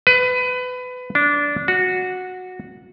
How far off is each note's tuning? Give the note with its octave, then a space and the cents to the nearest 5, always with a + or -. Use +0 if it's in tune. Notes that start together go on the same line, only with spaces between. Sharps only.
B4 +25
D4 -15
F#4 -10